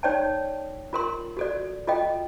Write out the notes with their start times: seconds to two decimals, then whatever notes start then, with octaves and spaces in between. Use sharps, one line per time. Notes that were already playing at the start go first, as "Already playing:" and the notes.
0.03 D#4 C#5 D5 G5 A5
0.93 F4 A#4 C6
1.37 F#4 A4 D5
1.87 F4 A4 D#5 G5